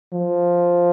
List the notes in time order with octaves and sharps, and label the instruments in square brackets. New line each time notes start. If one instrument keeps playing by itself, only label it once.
[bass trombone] F3